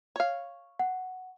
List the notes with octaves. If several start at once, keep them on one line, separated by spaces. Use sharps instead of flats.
C#5 F5
F#5